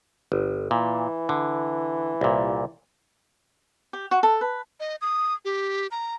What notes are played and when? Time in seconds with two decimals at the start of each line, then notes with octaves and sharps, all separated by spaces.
0.32 G1
0.71 A#2 E3
1.29 D3
2.21 C2 A#2
3.93 G4
4.11 F#4
4.23 A4
4.41 B4
4.80 D#5
5.01 D#6
5.45 G4
5.91 A#5